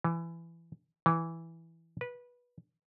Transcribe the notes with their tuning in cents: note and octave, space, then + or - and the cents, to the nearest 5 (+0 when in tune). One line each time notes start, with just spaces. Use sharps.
E3 +20
E3 +0
B4 -15